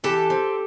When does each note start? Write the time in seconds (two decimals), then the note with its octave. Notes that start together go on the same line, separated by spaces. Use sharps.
0.04 E3 G4 A4
0.30 C4